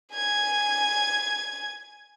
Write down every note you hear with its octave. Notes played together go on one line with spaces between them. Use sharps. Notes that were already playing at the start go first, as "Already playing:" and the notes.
G#5 G#6